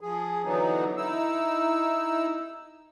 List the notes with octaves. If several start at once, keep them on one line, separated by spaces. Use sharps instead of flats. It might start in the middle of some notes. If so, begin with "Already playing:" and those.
F3 G#4
D3 E3 F#3 B3 D#4
D#4 E4 E6